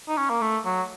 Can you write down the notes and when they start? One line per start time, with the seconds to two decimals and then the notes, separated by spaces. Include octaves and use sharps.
0.09 D#4
0.17 C#4
0.30 A#3
0.41 A3
0.65 F#3